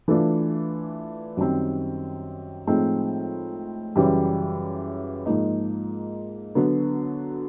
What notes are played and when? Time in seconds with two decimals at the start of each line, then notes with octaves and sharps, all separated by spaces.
0.08 E3 A3 D4 F4
1.37 F#2 D#3 G3 C4
2.67 A2 F3 G#3 C4 D#4
3.96 F#2 C#3 E3 G3
5.26 G#2 F3 A#3 D#4
6.55 D3 F#3 B3